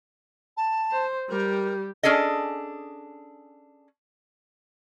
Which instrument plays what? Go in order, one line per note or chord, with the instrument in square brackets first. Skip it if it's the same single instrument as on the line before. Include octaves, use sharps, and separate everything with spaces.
[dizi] A5
[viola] C5
[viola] G3 G4 [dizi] A#4
[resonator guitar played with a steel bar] C#4 D4 G#4 A4 D#5